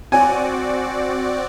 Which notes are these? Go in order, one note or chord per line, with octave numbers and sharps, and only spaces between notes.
C4 F#4 D5 G#5